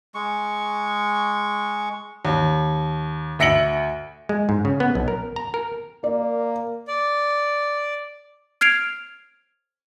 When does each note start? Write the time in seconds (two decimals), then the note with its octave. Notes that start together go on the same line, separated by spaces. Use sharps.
0.15 G#3 C#6
2.25 D#2
3.39 D2 E5 A#6 C#7 D7 F#7
4.29 G#3
4.49 G#2
4.65 C#3
4.80 B3
4.95 B1
5.08 A#4
5.36 A#5
5.54 A#4
6.04 A#3 D5
6.88 D5
8.61 F6 G#6 C7 D7 F7